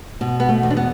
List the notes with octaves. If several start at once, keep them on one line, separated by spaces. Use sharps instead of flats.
B2
B3
A3
E2
D4
B3